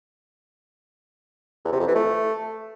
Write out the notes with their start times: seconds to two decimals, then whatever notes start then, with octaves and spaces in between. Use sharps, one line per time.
1.65 E2
1.72 C3
1.80 F2
1.87 E3
1.95 A3